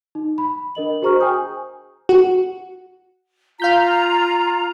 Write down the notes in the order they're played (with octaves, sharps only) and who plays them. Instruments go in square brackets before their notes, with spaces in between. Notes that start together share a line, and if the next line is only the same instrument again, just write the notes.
[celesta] D#4
B5
D4 A#4 D#5 F#7
F#4 G#4 C5 A#5 C#6 F6
G5 G#5 D#6 G6
[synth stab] F#4
[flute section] F4 A#5 [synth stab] F5 G6 B6